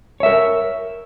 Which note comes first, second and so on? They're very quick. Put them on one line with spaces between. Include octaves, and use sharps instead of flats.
C#5 E5 A#4